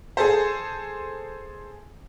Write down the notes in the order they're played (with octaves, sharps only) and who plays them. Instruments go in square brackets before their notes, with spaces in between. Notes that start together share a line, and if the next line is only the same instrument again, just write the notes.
[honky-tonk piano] G#4 A4 C5